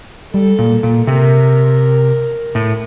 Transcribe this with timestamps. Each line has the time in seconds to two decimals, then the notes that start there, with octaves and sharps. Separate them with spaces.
0.33 G3 A4
0.59 A#2
0.83 A#2
1.07 C3 A#4
2.55 A2